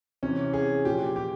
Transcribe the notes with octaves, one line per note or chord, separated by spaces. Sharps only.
C3 C#4
E3
G#4
A#2 F3 G4
G4